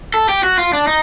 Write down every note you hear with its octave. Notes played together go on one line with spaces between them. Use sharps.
A4
G4
F#4
F4
D4
D#4